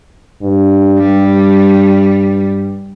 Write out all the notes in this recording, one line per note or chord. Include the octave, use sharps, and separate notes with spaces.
G2
G3